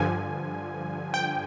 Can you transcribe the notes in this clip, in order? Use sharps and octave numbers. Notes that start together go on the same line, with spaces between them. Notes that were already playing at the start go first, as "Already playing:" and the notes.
Already playing: G2 D3 F3 G#5
G5